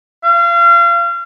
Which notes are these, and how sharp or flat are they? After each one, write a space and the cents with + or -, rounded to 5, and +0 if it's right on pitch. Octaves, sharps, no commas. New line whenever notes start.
F5 -35